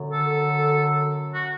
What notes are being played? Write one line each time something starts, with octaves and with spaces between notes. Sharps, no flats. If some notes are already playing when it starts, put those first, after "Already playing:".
Already playing: F#2 D3
A4
F#4